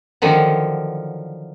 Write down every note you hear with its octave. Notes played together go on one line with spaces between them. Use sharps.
D3 D#3 F3 F#3